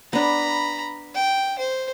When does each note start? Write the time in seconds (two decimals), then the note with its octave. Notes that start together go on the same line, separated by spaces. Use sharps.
0.13 B3 D4 A#5 B5
1.15 G5
1.59 C5